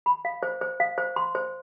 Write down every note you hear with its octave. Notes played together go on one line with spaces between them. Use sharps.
B5
F5
C5
C5
F5
C5
C6
C5